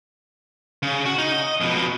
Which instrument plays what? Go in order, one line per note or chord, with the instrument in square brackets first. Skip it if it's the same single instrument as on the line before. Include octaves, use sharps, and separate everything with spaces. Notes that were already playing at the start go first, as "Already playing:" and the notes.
[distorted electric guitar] C#3
F#4
D#4
D#5
F2 B2